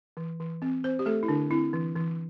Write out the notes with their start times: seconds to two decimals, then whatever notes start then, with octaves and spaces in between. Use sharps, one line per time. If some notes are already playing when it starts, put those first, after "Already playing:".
0.17 E3
0.40 E3
0.62 C4
0.84 C4 C5
0.99 G4
1.06 A3 A4
1.23 E4
1.28 D3 D4
1.50 C4 E4
1.73 E3
1.96 E3